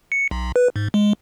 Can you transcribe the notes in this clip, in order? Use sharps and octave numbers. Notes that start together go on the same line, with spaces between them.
C#7
B1
B4
G#2
G#3